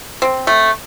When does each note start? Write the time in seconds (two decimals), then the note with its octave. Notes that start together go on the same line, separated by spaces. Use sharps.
0.22 C4
0.47 A3